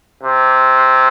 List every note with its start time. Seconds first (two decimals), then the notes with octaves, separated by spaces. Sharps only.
0.23 C3